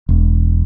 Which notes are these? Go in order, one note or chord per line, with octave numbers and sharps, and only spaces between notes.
E1